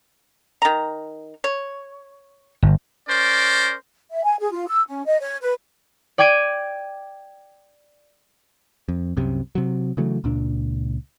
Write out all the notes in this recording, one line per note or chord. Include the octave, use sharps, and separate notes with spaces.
D#3 A#5
C#5
G1
C#4 A#4 C5 D5
E5
G#5
G#4
F4
E6
C#4
D#5
C#5
B4
D5 G5 D6 G#6 D7 D#7
F2
C2 F#2 C3
C3 F#3
C#3 E3 F#3 A3
C#2 A#2 D4